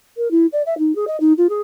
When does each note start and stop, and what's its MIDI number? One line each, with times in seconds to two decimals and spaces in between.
0.17 0.30 70
0.31 0.46 64
0.52 0.62 74
0.66 0.77 76
0.78 0.94 63
0.95 1.05 68
1.07 1.16 75
1.20 1.32 63
1.37 1.47 65
1.49 1.61 68